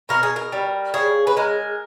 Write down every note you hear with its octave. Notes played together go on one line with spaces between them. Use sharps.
B2 A#4
G#4
A#4
G3
C#3 G#4
B4
G#3 A#4